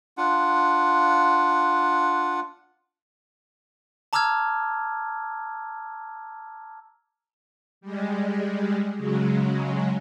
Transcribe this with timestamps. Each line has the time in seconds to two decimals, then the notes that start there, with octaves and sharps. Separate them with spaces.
0.17 D4 F4 F#5
4.13 A5 A#5 D6 E6 F6 G#6
7.81 G3 G#3
8.97 C#3 F#3 G#3